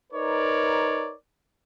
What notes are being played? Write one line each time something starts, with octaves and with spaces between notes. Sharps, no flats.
D#4 A#4 B4 C#5 D5